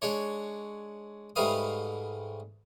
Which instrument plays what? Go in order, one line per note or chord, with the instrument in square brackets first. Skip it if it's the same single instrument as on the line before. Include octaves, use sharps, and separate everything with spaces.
[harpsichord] G#3 D4 C#5
G#2 G3 A3 B4 F5 D#6